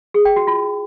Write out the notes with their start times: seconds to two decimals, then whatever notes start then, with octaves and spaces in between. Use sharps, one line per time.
0.14 G#4
0.25 G5
0.36 F#4
0.47 F4